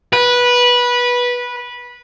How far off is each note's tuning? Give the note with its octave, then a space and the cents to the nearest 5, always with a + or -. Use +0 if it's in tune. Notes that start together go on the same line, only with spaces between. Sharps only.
B4 -15